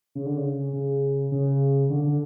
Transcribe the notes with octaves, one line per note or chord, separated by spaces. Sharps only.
C#3
D3
C#3
C#3
C#3
D3
D3